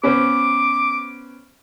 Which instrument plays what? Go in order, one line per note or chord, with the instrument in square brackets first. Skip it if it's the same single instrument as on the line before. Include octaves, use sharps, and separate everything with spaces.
[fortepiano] B3 C#4 C5 [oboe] D6